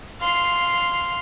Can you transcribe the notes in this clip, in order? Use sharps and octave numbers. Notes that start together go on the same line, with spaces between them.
F5 C6